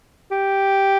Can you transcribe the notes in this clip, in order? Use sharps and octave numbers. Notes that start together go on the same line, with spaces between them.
G4